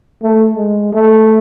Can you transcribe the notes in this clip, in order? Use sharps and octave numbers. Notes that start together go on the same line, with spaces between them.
A3
G#3
A3